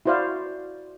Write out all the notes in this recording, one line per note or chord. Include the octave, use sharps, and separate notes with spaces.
E4 F#4 C5 D5 F5